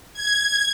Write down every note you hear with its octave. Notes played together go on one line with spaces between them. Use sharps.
G#6